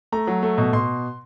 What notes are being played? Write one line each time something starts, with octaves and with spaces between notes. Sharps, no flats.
A3 A#5
F#3
A3
B2
B2 C6